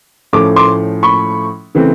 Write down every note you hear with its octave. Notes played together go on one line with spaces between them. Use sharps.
A2 F3 A3 C#4 D6
C6 D6
B5 C#6
C#3 E3 A3 C4